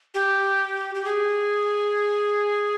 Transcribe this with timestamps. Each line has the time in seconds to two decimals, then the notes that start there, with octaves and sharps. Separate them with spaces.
0.14 G4
0.95 G4
1.05 G#4